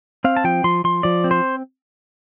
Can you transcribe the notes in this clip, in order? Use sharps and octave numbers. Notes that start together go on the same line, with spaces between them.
C4 F5
A5
F3 G5
F3 C6
F3 C6
F3 D5
C4
C5